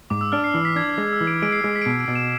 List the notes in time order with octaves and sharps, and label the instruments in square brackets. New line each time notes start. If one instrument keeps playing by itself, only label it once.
[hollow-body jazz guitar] G#2 [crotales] D6
[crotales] E6
[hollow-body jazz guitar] D4 [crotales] F6
[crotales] C7
[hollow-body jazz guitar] E3
[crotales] B6
[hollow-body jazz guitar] D4 [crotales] G#6
[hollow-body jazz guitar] G#3
[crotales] E6
[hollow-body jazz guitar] E3
[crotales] D7
[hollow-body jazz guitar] G#3 [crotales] D7
[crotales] C7
[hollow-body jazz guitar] G#3 [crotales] D7
[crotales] B6
D7
[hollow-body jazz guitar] B2 [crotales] C7
[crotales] D7
[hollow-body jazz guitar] B2
[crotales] E7